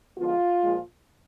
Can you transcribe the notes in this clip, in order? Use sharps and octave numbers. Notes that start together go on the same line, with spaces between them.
D3 F3 G#3 B3 F4
A#2 F3 G#3